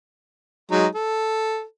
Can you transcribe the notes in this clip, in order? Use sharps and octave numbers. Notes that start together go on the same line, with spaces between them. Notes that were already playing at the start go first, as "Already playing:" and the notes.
F#3 G#3 D#4
A4